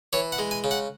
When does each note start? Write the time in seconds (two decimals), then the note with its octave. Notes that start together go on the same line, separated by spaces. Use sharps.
0.13 E3 C#5
0.32 F#5
0.39 G#3
0.51 G#5
0.64 C#3
0.71 F#5